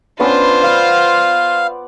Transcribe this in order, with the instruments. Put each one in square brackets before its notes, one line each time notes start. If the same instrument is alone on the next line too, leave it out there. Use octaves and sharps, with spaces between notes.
[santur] B3 C#4 E6 [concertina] D4 [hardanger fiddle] F4 C5
[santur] D5 [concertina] F5